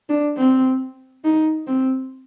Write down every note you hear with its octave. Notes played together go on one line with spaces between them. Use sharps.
D4
C4
D#4
C4